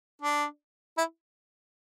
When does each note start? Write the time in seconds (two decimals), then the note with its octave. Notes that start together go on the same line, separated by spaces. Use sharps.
0.22 D4
0.98 E4